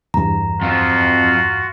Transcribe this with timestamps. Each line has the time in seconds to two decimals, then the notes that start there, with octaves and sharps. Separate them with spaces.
0.14 E2 G2 A#5
0.61 F2 F3 F4 F#4